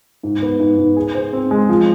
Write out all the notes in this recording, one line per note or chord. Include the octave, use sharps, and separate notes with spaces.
G#2
B3
G#2
G#2
G#4
C5
C4
G#3
F3